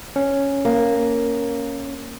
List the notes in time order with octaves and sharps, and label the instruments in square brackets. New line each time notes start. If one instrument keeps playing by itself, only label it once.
[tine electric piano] C#4
[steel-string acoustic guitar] A#3